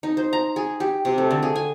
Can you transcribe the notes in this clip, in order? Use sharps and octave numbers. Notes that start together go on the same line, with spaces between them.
D#4
C5
A#5
G#4
G4
C3
A3
D3
G#4
G#5